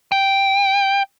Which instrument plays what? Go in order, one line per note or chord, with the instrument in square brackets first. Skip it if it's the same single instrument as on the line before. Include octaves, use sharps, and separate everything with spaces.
[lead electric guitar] G5